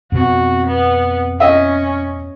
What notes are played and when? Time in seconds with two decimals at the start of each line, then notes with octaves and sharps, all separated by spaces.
0.12 F2 B2 C4 F#4
0.67 B3
1.40 C#4 D#5 E5